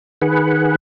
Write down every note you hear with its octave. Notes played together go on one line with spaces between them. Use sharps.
D#3 G#4 B4 F#5